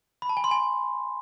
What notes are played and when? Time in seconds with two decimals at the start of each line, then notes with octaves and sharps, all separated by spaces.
0.22 B5
0.29 A5
0.37 G#5
0.44 C6
0.51 G#5